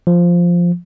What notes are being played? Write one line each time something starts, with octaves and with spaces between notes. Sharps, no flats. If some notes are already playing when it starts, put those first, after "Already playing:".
F3